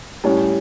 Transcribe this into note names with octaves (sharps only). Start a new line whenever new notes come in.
A2 G3 C#4